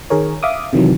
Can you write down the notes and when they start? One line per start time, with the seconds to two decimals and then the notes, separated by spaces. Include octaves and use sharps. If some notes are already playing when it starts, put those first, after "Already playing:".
0.10 D#3 G#4 A#4 C#5
0.43 E5 F5 D6 D#6
0.73 C3 D#3 E3 F#3